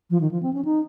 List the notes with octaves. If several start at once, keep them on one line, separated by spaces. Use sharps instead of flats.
F3
D#3
F3
C4
C#4
D#4